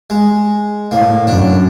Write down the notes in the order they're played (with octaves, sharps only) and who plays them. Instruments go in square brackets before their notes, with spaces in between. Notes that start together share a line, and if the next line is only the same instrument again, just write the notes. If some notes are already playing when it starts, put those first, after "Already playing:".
[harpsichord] G#3
[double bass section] A2 [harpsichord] A#3
[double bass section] F#2 [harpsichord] D4